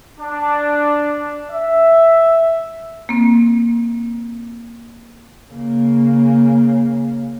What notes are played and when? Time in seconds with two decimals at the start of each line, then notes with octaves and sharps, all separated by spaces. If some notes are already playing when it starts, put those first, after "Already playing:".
0.19 D4
1.50 E5
3.09 A#3 C4
5.52 C#3 A#3